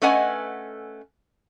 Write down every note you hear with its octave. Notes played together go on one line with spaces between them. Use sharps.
A3 C#4 B4 D#5 F#5 G#5